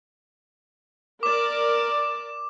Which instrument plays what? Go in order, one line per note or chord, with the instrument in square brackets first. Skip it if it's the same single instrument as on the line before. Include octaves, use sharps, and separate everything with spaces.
[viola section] A#4 D5 [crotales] D6 E7